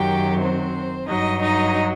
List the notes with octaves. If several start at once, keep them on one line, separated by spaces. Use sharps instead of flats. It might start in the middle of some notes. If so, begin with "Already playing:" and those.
Already playing: F#2 D#3 F#3 G4 G5
C4 C5
G2 F#3 D#4 D#5
D#4 D#5